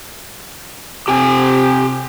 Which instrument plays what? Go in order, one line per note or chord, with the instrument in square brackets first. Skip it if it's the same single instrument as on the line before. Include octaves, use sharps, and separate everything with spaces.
[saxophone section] C3 [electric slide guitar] G4 G5 G#5